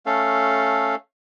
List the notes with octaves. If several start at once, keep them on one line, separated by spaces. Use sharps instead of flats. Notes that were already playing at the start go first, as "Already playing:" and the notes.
A3 C#4 A4 F5